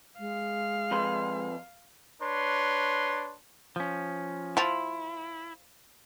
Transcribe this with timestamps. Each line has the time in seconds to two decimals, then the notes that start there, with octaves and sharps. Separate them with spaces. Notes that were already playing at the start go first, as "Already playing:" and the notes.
0.19 G#3 F5
0.91 F2 B4 C6
2.22 D4 B4 C#5 C6
3.76 F3 C#4
4.57 F3 E4 F4